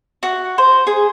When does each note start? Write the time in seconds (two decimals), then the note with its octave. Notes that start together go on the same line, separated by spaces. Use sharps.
0.23 F#4
0.58 C5
0.87 G#4